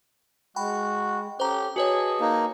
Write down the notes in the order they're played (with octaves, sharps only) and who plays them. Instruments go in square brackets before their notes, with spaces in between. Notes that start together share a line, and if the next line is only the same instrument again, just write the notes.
[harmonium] G#3 [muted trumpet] F#4 [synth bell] G5 B5
[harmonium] C#4 A4 [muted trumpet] G4 [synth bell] C5 A#5
[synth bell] F#4 B4 C#5 [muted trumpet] G#4 [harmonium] D#5 A5
[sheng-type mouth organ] A#3 D#4